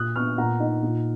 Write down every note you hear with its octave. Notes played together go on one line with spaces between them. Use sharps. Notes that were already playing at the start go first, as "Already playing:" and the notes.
Already playing: A#2 D#6 F#6
B3 C#6 F6
A#2 F#5 A#5
D#4
A#2